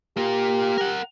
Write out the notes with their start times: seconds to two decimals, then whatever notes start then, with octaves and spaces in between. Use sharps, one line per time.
0.17 A#3 F4 G4
0.78 A#4 F#5